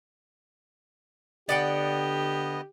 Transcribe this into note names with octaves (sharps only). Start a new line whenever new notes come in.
D3 B3 G4 D5 D#5 F#5 G5